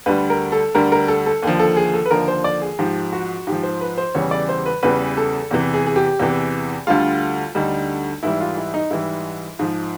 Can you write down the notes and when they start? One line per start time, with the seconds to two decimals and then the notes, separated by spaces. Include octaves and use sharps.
0.06 D2 D3 G3 B4
0.30 A#4
0.52 A4
0.74 D2 D3 G3 A#4
0.92 A#4
1.08 A4
1.26 A4
1.43 D#2 D3 F3
1.59 A4
1.76 G#4
1.94 A4
2.06 B4
2.11 D#2 D3 F3 A#4
2.28 C5
2.44 D5
2.62 G#4
2.79 G#2 F3 G4
3.13 F#4
3.47 G#2 F3 G4
3.63 C5
3.81 B4
3.98 C5
4.15 E2 C#3 E3 G3 C#5
4.31 D5
4.49 C5
4.66 B4
4.83 E2 C#3 E3 G3 B4
5.17 A4
5.51 E2 C3 E3
5.74 G#4
5.86 G#4
5.96 G4
6.19 E2 C3 E3
6.87 D2 D3 G3 F4
7.55 D2 D3 G3 D#4
8.23 G#2 E3 G3 E4
8.41 F4
8.57 E4
8.74 D#4
8.91 G#2 E3 G3 E4
9.59 G#2 F3